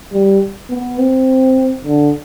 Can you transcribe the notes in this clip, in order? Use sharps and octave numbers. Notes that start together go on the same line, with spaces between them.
G3
B3
C4
D3